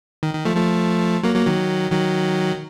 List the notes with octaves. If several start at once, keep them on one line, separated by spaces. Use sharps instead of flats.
D#3
D#3
F3 A3
F3 A3
F#3 A#3
F#3 A#3
D#3 F#3
D#3 F#3